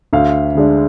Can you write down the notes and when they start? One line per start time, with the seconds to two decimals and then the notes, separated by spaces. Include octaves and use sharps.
0.13 D2 F5
0.55 D3 G#3 D4